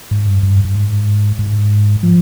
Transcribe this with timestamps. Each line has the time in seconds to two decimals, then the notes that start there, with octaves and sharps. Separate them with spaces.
0.11 G#2
0.27 G2
0.43 G2
0.65 G2
0.75 G#2
1.39 G#2
2.03 F3